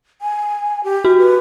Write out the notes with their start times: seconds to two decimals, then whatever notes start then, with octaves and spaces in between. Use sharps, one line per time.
0.22 G#5
0.84 G4
1.05 F#4
1.19 B4